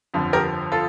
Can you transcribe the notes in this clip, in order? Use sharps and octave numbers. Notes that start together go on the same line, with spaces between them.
G1 F2 D3 F3
G4 A#4
F4 A4